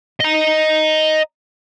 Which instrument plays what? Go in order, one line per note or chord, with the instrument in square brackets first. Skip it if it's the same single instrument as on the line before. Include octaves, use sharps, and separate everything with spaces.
[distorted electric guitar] D#5 A#5